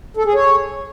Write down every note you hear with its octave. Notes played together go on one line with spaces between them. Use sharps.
A4
G#4
C#5